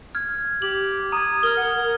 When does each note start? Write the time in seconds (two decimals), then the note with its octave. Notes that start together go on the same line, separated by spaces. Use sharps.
0.15 F6 G#6
0.62 G4 F#7
1.12 A#5 D#6 G#6
1.43 A#4 F6 G7
1.57 F#5
1.77 A#4